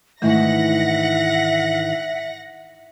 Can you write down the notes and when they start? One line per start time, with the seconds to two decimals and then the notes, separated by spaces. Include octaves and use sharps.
0.22 G#2 D#3 E3 A3 E4 E5 F#5 A#6